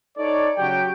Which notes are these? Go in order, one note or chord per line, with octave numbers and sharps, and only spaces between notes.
D#4 A4 C#5 D5
C#3 F#3 F#4 G4 G5